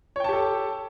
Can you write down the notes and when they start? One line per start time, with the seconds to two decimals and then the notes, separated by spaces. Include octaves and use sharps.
0.16 C#5
0.20 G5
0.24 A5
0.29 G4
0.33 A4